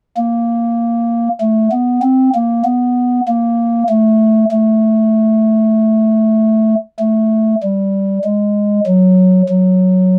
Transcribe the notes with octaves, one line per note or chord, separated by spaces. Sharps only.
A#3
A3
B3
C4
A#3
B3
A#3
A3
A3
A3
G3
G#3
F#3
F#3